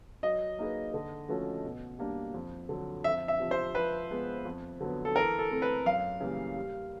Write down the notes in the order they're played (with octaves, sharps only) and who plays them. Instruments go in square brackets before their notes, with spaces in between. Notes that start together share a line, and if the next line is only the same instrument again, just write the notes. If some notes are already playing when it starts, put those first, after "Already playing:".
[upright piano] F#3 [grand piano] D#5
[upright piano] A#3 D#4 G#4 B4
D3
F3 A3 C#4 F#4
B2
G3 A#3 D4
F2
D3 F#3
[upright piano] F2 [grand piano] E5
[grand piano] E5
[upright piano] C3 F3
[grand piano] C5
[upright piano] F3 [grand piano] B4
[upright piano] G#3 B3
F2
D3 F#3 B3
[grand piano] A4
[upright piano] E3 [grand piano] A#4
[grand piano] A4
[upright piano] A3 C4
[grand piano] B4
[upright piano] F#2 [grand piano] F5
[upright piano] C#3 E3 G3 A#3
G3